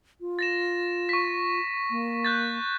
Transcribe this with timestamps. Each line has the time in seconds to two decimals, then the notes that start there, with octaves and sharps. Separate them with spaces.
0.21 F4
0.39 A6 A#6 E7
1.09 C#6 B6
1.90 A#3
2.25 F#6 G6 A6